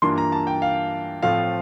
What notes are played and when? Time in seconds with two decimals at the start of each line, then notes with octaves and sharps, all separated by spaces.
0.02 G2 E3 A#3 D4 F4 C6
0.18 A#5
0.32 A5
0.47 G5
0.62 F5
1.22 A2 F3 A3 C4 F4 F5